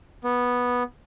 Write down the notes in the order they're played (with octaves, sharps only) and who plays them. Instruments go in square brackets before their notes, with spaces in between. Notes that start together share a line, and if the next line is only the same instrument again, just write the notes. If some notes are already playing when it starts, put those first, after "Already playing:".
[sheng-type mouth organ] B3